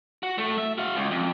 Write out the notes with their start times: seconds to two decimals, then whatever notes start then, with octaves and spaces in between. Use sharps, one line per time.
0.23 F#4
0.38 A2 A3
0.58 E5
0.78 F#4 F5
0.95 C#2
1.11 F2